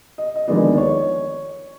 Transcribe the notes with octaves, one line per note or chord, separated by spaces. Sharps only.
D#5
D#5
D#2 D3 F3 G#3 B3 D5
C#5